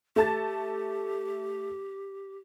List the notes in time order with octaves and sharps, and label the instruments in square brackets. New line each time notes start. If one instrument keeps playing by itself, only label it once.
[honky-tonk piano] A3 A5 A6 [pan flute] G4